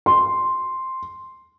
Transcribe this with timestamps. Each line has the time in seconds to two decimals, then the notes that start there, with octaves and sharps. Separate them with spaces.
0.06 C6